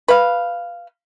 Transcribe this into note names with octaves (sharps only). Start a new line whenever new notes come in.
B4 F5